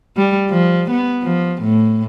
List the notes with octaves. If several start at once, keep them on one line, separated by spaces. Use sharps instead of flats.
G3
F3
B3
F3
A2